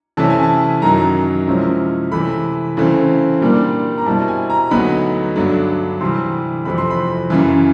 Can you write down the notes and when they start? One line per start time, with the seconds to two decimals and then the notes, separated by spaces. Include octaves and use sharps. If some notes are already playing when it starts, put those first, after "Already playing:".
0.17 C3 E3 A3 C#4 E4 A5
0.30 G#5
0.43 A5
0.82 F#2 D#3 F#3 A#5
1.47 C3 F3 G#3 C#4 E4
2.11 C3 E3 A3 B5
2.77 C#3 E3 A3 C4
3.41 A#2 G3 A#3 D4
3.98 A#5
4.06 B2 G3 C4 E4 A5
4.28 G#5
4.50 A#5
4.71 D2 D3 F#3 B3 D#4 B5
5.36 G2 D3 F#3 A3 D4
6.01 C3 E3 G3 C6
6.65 F2 C3 E3 A3 C4 B5
6.78 C6
6.90 B5
7.30 F#2 C#3 E3